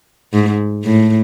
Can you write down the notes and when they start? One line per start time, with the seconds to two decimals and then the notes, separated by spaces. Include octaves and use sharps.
0.33 G#2
0.84 A2